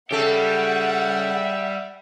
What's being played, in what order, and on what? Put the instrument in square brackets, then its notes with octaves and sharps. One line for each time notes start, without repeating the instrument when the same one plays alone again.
[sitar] C#3 A4 [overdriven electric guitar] G3 G4 [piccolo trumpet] E5 [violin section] F#5